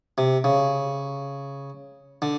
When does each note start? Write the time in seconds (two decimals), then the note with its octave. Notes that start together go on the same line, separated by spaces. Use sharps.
0.18 C3
0.44 C#3
2.22 D3